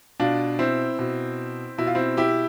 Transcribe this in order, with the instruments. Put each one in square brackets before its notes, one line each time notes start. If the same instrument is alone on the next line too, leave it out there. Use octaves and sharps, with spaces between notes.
[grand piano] B2 D4 F4
C4 E4
B2
B2 E4
F4
C4 E4
E4 G4